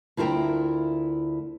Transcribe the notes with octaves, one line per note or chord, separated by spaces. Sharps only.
D2 E4 F4 A#4 G5